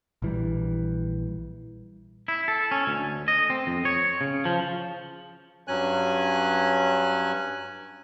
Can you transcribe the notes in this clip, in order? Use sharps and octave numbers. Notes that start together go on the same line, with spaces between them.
A#1 E3 G3
E4
A4
C#4
D2
D#5
C4
F2
C#5
C#3
F3
G2 F#3 C#4 G#5 F#6